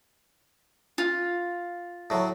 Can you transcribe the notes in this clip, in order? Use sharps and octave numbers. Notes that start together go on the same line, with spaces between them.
F4
A2 F#3